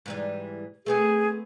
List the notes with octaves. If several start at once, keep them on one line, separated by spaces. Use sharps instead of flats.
G#2 E3 G3
A3 B3 C4 G#4